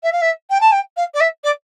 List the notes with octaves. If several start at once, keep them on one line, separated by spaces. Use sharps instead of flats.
E5
F5
E5
G5
A5
G5
F5
D5
E5
D5